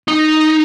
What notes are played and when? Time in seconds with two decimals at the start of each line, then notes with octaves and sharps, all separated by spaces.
0.08 D#4